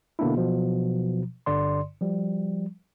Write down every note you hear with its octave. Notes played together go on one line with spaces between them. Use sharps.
B2 D3 A#3 B3 D4 E4
B2 F3 F#3
G1 G2 D3 D5 C6
F3 G3